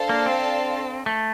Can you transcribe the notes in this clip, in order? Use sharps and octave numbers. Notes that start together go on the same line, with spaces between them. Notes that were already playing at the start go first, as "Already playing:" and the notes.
Already playing: D4 A4 C5 F5 A5
A#3
C4
A3